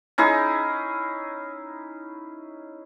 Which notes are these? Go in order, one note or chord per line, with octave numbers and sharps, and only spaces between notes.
C#4 D#4 E4 G#4